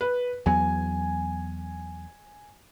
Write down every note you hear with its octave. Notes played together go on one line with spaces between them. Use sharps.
B4
E2 F#3 B3 G#5